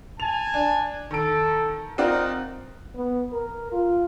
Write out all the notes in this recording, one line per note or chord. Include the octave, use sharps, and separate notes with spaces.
G#5 A5 F7
D4
D#3 A4 D7
C4 D#4 F4 A#4 D5 F#5
B3
A#4
F4